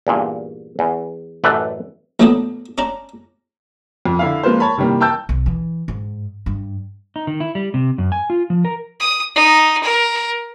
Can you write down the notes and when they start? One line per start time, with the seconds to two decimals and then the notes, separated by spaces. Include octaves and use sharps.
0.07 E2 G2 A#2
0.79 E2
1.44 A1 F#2 A3 B4 D5
2.20 A#1 F#3 A3 B3 D4 D#5
2.78 C#4 D4 A#5
4.06 F2
4.19 D3 E4 F5
4.43 F3 G#3 A#3 F4 B4 C5
4.60 C#5 A5 B5
4.77 C3 D#3 E3 G3 A#3
5.01 G5 A5 E6 G6
5.29 B1
5.46 E3
5.88 G#2
6.46 G2
7.16 D#4
7.27 D#3
7.40 E4
7.55 G3
7.74 C3
7.98 F#2
8.12 G#5
8.30 F4
8.50 F3
8.65 A#4
9.00 D#6
9.35 D#4
9.83 A#4